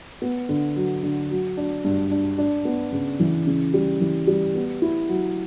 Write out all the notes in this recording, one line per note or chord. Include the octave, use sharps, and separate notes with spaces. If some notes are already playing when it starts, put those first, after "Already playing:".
B3
D3
F#3
D3
F#3
D4
G2
D4
D4
B3
C#3
E3
C#3
G3
E3
G3
B3
E4
F#3